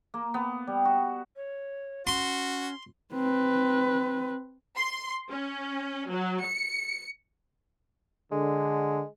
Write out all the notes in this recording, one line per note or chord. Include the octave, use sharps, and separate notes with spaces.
A#3
B3
G3
F#4
C#5
C#4 F#4 C6
C4 B4
C6
C#4
F#3
C#7
D3 G#3